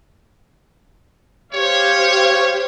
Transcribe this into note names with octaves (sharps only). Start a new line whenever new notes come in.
G4 C5 C#5 F5